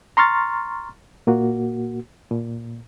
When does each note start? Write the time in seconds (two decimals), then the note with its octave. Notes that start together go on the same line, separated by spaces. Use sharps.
0.17 A#5 C6 C#6 F6 A6
1.27 A#2 A#3 F#4
2.31 A#2